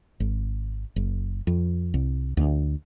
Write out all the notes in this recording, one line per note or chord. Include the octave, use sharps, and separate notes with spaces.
G#1
F#1
F2
C2
D2